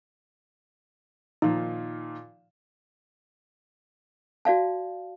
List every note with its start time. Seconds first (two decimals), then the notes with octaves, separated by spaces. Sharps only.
1.42 A#2 D#3 F3 D#4
4.45 F#4 D5 F5 A5